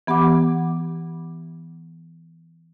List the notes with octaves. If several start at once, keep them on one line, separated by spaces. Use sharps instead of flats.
E3 B3 G4 F#5 D6